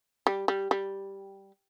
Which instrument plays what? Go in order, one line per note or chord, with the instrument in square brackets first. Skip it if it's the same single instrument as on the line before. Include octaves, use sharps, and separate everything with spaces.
[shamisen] G3
G3
G3